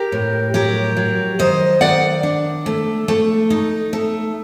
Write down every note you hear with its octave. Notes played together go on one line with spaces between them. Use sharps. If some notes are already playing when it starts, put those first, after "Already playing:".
Already playing: G4 A#4
A2
F#3 G4 A#4
F#3
D#3 C5 D#5
D#3 D5 F#5
D4
A3
A3
D#4
A3